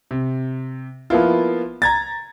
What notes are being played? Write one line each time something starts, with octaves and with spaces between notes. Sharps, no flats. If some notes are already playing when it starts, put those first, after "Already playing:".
C3
F3 A#3 B3 E4 F4
A#5 G#6 A6